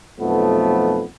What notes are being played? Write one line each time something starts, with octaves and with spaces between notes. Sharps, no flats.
B1 F2 F3 A3 B3